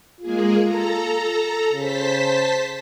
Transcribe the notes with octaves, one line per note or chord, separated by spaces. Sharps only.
G#3 A#3 F4 G#4
A4 A#5
C#3 C5 A5 B6